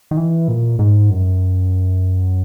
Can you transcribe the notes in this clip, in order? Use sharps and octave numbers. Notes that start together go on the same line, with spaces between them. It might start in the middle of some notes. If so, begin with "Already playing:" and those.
D#3
E3
A#2
G#2
F#2